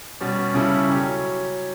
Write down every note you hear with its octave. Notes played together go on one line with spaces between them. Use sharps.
B2 G3 C#4 F#4
C#3 G3 C#4 E4 A4
F#3 C#4 G4